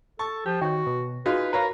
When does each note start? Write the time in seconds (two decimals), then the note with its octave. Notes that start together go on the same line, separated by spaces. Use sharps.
0.19 A4 A5 C#6
0.46 F3 G4
0.61 D#3 F#4 C#5 G5
0.87 B2
1.26 D#4 F4 F#4 G#4 B4
1.53 A#4 B4 C#5 F5 A#5